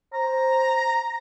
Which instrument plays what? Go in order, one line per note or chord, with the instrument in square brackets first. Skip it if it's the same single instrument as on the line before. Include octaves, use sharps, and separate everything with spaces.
[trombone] C5 [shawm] A#5